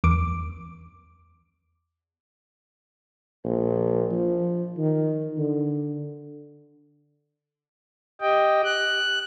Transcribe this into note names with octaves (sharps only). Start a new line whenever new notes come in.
E2 D6
A#1
F3
D#3
D3
G4 D#5 G5
F#6